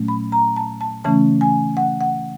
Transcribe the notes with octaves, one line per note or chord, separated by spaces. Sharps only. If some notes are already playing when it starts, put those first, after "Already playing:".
Already playing: A#2 F#3 A3 C#4
B5
A#5
A5
A5
C#3 E3 A3 C#4 A5
G#5
F#5
F#5